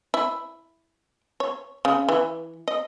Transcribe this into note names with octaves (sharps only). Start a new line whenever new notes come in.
E4
C#5
C#3
E3
D#5